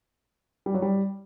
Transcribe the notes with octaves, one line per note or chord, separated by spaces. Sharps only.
G3
F#3
G3